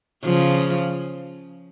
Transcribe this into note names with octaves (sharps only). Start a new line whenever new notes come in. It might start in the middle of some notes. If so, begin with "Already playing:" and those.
C#3 F3